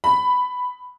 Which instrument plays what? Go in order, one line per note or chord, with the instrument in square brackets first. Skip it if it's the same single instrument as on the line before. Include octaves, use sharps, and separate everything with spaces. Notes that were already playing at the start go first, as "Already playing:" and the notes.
[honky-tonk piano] B5